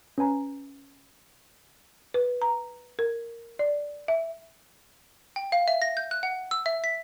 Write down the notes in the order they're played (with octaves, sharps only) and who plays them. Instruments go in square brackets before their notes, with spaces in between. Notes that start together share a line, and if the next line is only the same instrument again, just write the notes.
[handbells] C#4 B4 G#5 A#5
[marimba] B4
A#5
A#4
D5
E5
[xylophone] G5
F5
E5
A#6
G6
F#6
F#5
E6
E5
B6